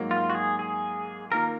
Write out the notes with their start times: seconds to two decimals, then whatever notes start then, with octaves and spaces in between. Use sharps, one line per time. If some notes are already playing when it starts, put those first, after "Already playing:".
Already playing: G#2 F#3 A#3
0.11 F4
0.30 F#4
0.35 G#4
0.59 G#4
1.32 D#3 A#3 F4 A#4